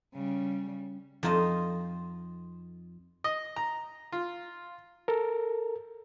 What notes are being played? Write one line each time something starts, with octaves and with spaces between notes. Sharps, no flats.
C#3 G3
F2 D#4 F4 C5 D#5
D#5
A#5
F4
A4 A#4